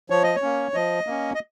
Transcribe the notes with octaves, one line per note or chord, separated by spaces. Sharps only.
F3 C#5
D#5
C#5
A#3 C#4
F3 D#5
A#3 C#4
D#5